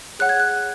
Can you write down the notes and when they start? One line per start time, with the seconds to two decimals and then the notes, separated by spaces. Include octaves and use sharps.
0.19 G#4 C#5 F#5 F#6
0.29 G#6
0.40 F#6